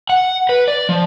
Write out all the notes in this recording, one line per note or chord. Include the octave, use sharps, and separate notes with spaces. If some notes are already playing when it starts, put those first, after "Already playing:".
F#5
B4
D5
F3